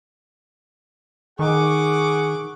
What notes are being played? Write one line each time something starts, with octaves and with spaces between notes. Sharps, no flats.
D#3 G#4 F#5 C#6 D6